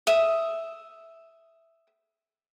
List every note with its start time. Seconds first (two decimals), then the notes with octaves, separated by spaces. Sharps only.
0.07 E5 D#6